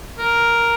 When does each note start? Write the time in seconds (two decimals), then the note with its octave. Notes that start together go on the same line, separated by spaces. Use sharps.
0.17 A#4